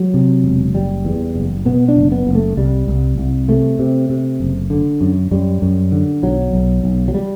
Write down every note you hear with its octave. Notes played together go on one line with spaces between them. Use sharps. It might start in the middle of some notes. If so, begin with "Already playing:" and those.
Already playing: F#3
C3
E1
F#1 G3
E2
F#1
B2 B3
D4
F#1
B3
F#1
A3
C2 G3
C2
C2
C3 A3
C3
C3
F#1
D3
F#2
F#2 G3
F#2
D3
B1 F#3
B1
B1
F#3
G3